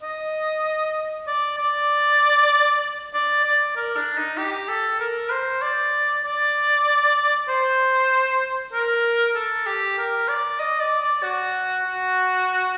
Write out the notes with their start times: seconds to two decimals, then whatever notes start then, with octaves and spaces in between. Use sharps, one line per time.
0.03 D#5
1.27 D5
1.58 D5
3.14 D5
3.44 D5
3.76 A#4
3.97 D4
4.17 D#4
4.38 G4
4.68 A4
5.00 A#4
5.31 C5
5.62 D5
6.25 D5
7.49 C5
8.73 A#4
9.35 A4
9.66 G4
9.98 A#4
10.29 D5
10.60 D#5
10.80 D5
11.02 D5
11.23 F#4
11.84 F#4